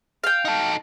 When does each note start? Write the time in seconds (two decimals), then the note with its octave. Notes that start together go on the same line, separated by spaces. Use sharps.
0.24 F5 G5
0.45 D#4 A4